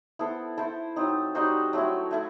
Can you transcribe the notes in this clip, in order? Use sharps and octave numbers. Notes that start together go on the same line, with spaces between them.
B3 E4 A4 C5
E4 A4 C5
F#3 C4 D#4
G3 D#4 F#4 C5
F#3 A3 C4 E4
A3 E4 A4